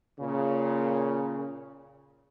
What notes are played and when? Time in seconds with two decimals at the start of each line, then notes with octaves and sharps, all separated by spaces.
0.19 A#2 C#3